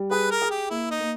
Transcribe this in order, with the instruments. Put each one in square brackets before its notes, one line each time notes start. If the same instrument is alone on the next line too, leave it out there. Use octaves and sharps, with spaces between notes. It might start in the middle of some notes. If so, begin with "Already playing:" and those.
Already playing: [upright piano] G3
[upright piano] G#4 [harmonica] B4
[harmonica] A#4
[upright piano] G#4
[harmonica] G4
[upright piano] A#3 [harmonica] E4
[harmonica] D#4
[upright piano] A#3